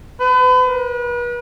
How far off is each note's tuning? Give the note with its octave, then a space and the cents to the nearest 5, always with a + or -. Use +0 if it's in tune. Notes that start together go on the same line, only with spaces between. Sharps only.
B4 +35
B4 -40